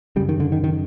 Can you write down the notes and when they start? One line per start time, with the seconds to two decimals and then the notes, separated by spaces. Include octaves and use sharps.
0.16 C#3 G3
0.20 F#2
0.29 D#3
0.40 D3
0.52 D#3
0.64 D#3